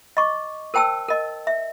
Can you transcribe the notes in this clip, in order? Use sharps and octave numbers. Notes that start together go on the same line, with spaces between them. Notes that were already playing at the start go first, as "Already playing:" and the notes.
D#5 C#6 D6
A#4 C5 G5 A5 E6
A#4 D#5
E5